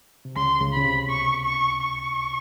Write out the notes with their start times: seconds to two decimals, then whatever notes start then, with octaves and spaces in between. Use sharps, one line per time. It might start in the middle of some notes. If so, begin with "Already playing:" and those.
0.25 C3
0.36 C#2 C#3 C6
0.61 C#2 C#3
0.73 C#3 B5
0.84 C2 C3
1.09 B2 C#6
1.45 C#6
1.82 C#6